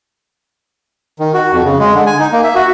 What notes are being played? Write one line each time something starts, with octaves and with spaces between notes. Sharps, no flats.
D#3
F#4
F2
C#3
G#3
D3
G#5
D#4
A#3
E5
F#4